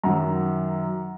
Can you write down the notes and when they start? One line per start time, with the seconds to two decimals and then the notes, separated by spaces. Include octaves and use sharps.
0.03 F#2 D#3 F#3 F#5 A#5